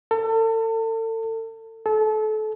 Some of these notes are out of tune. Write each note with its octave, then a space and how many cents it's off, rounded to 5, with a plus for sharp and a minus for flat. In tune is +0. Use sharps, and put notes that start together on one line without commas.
A4 +35
A4 -30